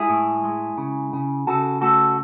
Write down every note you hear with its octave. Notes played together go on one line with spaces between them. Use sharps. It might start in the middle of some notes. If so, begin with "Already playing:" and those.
Already playing: G#3 E4 G#4
A2
G#3
C#3
C#3
C#3 F#4 A4
A3 F#4 A4